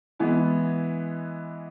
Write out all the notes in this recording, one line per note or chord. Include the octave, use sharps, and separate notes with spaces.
E3 G#3 B3 E4